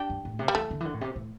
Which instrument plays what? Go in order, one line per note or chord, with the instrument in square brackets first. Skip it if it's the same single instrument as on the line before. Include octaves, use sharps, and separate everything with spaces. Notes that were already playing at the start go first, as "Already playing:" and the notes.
Already playing: [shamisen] D4 G4
[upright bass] G2
A2
C3
[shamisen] G3
[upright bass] E3 [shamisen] A3
[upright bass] D3
E3
D3
A2
C3
A2